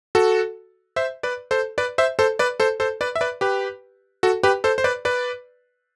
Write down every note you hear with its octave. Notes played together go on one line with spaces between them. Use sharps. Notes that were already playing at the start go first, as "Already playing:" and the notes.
F#4 A4
C5 E5
B4 D5
A4 C5
B4 D5
C5 E5
A4 C5
B4 D5
A4 C5
A4 C5
B4 D5
E5
B4 D5
G4 B4
F#4 A4
G4 B4
A4 C5
C5
B4 D5
B4 D5